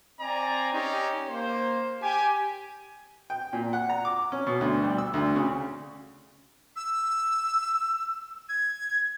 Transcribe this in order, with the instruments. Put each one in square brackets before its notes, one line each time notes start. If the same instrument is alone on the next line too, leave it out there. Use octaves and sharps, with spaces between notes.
[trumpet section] C4 D5 G#5 A#5
C#4 D#4 G4
A#3 C5
G4 G#5
[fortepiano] G5
A#2
F#5
A#5
D6
C#4
B2
D2
G3
E6
D2
C#3
[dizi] E6
G#6